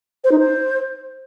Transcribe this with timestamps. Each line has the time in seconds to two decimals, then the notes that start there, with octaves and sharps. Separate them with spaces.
0.24 C5
0.32 D#4
0.39 C5